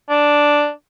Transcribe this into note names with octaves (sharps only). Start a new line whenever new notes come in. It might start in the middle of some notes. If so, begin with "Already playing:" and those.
D4